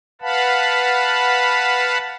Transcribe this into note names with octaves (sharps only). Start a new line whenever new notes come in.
B4 F5 F#5 A5 B5